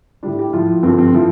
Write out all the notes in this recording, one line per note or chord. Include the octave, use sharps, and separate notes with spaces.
A2 G3 D4
G4
A2 F3 F4
G2 D3 F3 C4
C4
A2 F3